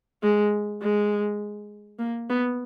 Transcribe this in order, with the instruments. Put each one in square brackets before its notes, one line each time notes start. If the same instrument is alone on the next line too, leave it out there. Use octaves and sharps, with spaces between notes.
[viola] G#3
G#3
A#3
B3